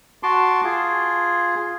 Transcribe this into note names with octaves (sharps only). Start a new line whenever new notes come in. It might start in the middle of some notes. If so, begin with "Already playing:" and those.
F#4 A5 C6 D6
F4 G#4